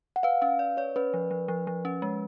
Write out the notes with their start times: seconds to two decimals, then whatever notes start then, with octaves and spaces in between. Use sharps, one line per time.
0.16 F#5
0.23 B4 F5
0.42 C#4 F5
0.59 D5
0.77 C#5 D5
0.96 C#4 B4
1.14 F3
1.31 F3
1.48 F3
1.67 F3
1.85 C#4
2.02 G#3